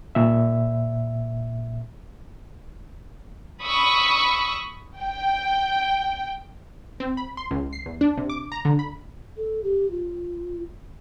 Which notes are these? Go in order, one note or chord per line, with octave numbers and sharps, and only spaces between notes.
A#2 E5
B5 C#6 D#6 E6
G5
C4
B5
C6
C#2
C7
E2
D4
C3
D6
A#5
D3
B5
A4
G4
F4